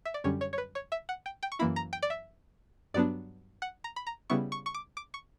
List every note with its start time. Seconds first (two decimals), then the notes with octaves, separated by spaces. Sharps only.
0.05 E5
0.14 D5
0.24 F#2 D3 G3 C#4 C#5
0.41 C#5
0.53 C#5
0.58 B4
0.75 C#5
0.92 E5
1.09 F#5
1.26 G5
1.43 G5
1.52 C#6
1.59 F#2 E3 A#3 E4 B5
1.76 A#5
1.93 G5
2.02 D5
2.10 E5
2.94 G2 F#3 B3 D4 D5
3.62 F#5
3.84 A#5
3.96 B5
4.07 A#5
4.30 C#3 G3 B3 E4 C#6
4.52 C#6
4.66 C#6
4.74 D6
4.97 D6
5.14 C#6